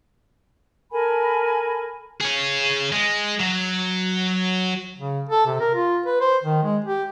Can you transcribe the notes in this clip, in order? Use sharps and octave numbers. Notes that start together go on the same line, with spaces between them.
A4 A#4 G#5 B5
G#4 C#5
G#3
F#3
C#3
A4
C3
A#4
F4
B4
C5
D#3
G#3
G4